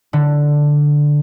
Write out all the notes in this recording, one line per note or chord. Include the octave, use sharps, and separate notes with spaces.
D3